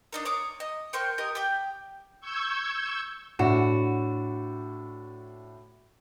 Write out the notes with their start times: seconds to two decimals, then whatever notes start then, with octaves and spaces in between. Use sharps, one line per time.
0.13 D4 D#4 A#4
0.25 C#5 A#5 D6 D#6
0.60 D#5
0.93 A#4 C5 G5 C#6
1.18 G4 A#4 D#5
1.35 G4 G5
2.20 C#6 E6 G6 G#6
3.39 A2 D4 F#4 E7